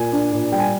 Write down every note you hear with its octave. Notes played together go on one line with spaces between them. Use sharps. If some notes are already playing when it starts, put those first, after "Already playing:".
Already playing: A#2 G#5
D4
A#2
G3 G5
G#5